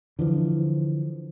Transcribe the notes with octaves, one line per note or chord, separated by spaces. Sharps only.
D3 E3 F3